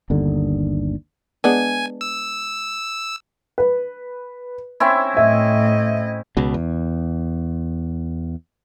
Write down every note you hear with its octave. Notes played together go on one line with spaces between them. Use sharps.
G1 D#2 D3
G#3 B3 D4 G#5
E6
B4
C4 C#4 E4
A2 D#5 E5
C#2 B2
E2